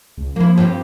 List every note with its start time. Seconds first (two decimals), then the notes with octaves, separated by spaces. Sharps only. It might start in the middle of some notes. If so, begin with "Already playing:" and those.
0.18 C#2
0.36 F3 A#3 E4
0.57 G2 C4 G4